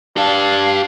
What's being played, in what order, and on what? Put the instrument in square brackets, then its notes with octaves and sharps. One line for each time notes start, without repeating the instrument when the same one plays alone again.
[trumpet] D4 [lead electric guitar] G4 A5 [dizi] F5